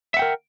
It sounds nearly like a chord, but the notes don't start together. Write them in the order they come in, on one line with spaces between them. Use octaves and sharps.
E5 F#5 G5 A#4